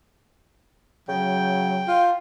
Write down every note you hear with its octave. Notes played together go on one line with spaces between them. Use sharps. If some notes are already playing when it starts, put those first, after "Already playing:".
C#3 F#3 G5
F4